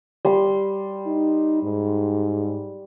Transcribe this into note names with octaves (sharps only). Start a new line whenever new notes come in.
G3 C6
D#4
G#2